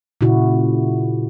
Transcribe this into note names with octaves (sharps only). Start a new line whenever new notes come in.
A#2 C#3 E4 F#4